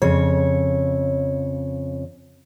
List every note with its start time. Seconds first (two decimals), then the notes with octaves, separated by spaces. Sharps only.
0.02 F2 C#3 C#5